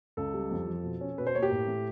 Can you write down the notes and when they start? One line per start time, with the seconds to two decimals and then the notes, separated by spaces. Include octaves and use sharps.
0.17 C#2 A4
0.34 G3
0.51 F2
0.67 F3
0.83 B2
1.01 C#4
1.18 B2 B4
1.27 C5
1.35 A#3 C#5
1.42 G4
1.51 A2
1.68 A3